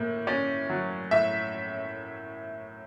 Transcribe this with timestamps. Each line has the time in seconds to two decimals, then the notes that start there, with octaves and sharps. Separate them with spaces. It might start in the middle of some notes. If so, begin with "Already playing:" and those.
Already playing: A2 A#3
0.27 C#4 D5
0.70 F#3
1.11 A2 E5